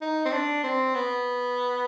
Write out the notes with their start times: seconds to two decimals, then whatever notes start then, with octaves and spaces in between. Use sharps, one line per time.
0.01 D#4
0.25 C4
0.32 D4
0.64 C4
0.95 B3